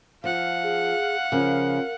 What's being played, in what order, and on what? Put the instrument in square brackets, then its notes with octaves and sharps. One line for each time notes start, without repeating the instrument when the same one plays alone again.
[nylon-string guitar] F3 [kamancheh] F5 F#5
[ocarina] G#4
[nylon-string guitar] C#3 F3 [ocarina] A#4